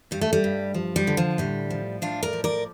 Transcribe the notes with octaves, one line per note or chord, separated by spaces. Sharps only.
G2 G3
A3
G3
G2
F3
G3
D3
F3
A2 G3
F3
A2 D4 F4
A#4 D5
F3
A#4 D5